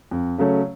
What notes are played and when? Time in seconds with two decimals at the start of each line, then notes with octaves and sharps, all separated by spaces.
0.11 F2
0.38 C#3 F#3 A3 C#4